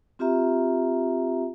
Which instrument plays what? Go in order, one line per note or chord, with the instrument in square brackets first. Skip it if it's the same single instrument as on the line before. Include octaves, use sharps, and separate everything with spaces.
[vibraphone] C4 F4 G4 E5 A#5